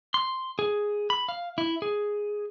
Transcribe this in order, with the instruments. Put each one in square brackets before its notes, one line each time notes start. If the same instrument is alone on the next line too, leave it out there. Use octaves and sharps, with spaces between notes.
[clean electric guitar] C6
G#4
B5
F5
E4
G#4